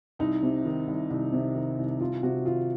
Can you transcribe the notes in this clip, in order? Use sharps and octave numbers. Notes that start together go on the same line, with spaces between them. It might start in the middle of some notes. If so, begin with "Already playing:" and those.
C2 D#4
C3
D#3
C2
C2
C3
D#3
C2
C2 F4
C3 F#4
D#3 F4